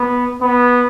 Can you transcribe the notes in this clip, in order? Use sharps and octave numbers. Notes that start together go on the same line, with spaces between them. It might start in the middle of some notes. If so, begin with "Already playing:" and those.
Already playing: B3
B3